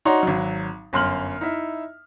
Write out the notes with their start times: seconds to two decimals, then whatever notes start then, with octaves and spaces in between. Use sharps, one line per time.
0.05 D#4 F#4 C#5 D5 A#5 C6
0.23 G#1 F#3
0.93 G1 F#2 C6 F6 F#7
1.41 D#4 E4 E5